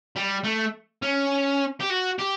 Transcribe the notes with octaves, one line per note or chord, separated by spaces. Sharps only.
G3
A3
C#4
G4
F#4
G4